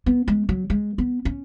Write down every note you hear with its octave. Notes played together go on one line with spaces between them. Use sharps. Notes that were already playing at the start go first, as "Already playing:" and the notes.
B3
G#3
F#3
G#3
B3
C#4